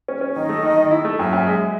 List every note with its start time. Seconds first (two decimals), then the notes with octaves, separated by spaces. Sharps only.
0.08 C#4
0.21 C#4
0.35 D#3 D#5
0.49 A3
0.63 D#3
0.77 D#3
0.91 E4
1.05 A3
1.19 F#2 E5
1.33 F#2
1.47 G#3